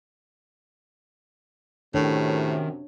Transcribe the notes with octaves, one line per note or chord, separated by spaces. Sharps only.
F#2 A2 C3 D#3 D4 C#5